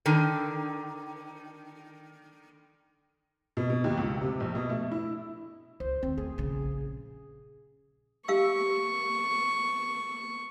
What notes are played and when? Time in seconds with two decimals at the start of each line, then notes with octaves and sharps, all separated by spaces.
0.06 D3 D#3
3.57 B2
3.70 B2
3.84 D#2
3.97 C#2
4.21 C3
4.40 A#1
4.55 B2
4.69 A3
4.91 E4
5.80 C#2 C5
6.03 D#2 C4
6.18 A3 G#4
6.38 A#1 C#3
8.28 G4 F5 C#6 E6